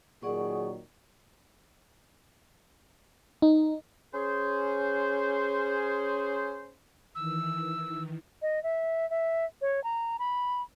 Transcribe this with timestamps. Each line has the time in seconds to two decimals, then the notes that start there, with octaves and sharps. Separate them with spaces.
0.23 A#2 D#3 F#3 G#4 D5 F#5 C#6
3.42 D#4
4.13 C#4 G#4 C5
7.15 D#3 E3 E6
8.42 D#5
8.63 E5
9.10 E5
9.62 C#5
9.84 A#5
10.19 B5